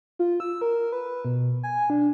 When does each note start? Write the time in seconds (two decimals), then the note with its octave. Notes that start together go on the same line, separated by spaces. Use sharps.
0.19 F4
0.40 E6
0.61 A#4
0.92 B4
1.25 B2
1.63 G#5
1.90 D4